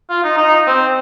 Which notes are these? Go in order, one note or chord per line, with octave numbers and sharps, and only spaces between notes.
F4
D#4
D#4
C4